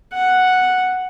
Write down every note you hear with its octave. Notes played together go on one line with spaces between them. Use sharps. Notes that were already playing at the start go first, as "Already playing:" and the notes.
F#5